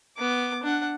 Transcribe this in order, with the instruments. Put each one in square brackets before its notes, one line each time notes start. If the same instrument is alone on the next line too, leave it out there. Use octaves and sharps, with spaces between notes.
[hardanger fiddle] B3 D6
D4 F#5